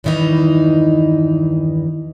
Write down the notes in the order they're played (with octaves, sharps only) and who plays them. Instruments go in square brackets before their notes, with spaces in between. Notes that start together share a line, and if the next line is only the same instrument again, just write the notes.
[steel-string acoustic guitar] E2 G2 D#3 E3 D#4